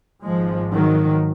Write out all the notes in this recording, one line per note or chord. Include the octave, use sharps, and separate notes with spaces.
G#1 G#2 F3 G#3
D#3 F#3